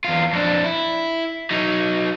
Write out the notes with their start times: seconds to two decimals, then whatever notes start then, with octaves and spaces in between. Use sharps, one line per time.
0.04 E2 F4
0.33 F2 D4
0.64 E4
1.51 F#3 D#4